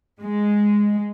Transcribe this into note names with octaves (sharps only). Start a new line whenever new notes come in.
G#3